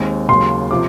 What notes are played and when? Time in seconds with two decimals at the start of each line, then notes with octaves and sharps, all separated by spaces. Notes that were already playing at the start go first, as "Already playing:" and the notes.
Already playing: D#2 D#3 G#3 C4
0.29 D#2 C#3 F#3 C6
0.71 C3 F3 D6